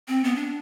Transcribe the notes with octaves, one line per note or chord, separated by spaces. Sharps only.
C4
B3
D4